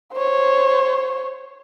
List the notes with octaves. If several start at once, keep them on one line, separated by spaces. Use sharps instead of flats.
C5 C#5